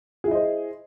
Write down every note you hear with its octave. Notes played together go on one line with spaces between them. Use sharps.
E4 G#4 C5 D#5